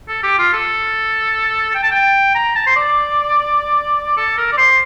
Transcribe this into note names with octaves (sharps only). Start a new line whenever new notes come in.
A4
G4
F4
A4
G5
A5
G5
A#5
A5
C5
D5
A4
A#4
D5
C5